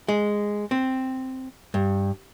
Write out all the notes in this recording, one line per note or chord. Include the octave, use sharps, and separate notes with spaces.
G#3
C4
G2